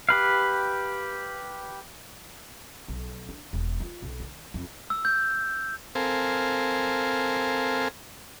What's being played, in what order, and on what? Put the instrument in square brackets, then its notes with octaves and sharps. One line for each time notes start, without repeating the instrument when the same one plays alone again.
[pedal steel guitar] G4 B4 F5
[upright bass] B1
D4
E1
F4
B1
D#3
F2
[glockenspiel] E6
G6
[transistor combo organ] C4 A4 A#4 C5 F5 G#5